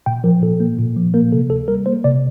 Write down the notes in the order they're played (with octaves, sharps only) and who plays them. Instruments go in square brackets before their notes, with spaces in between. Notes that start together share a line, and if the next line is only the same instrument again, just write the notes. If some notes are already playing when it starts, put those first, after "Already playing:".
[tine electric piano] A#2 G5
F3 A#4
A#2 A4
A#3
A#2
F3
A#3 A#4
C3 A4
D2 A4
G3 A#4
A#3 C5
C3 D5